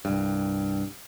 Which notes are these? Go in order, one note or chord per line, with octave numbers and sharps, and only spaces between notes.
C2 G2